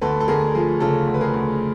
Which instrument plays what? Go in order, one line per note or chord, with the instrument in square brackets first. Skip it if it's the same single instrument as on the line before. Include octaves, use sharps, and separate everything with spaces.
[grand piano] D2 A4 B4
A4
D2 G#4 A#4
F3 G#4
C#3 A4
D2
B4
G#4 A#4
D2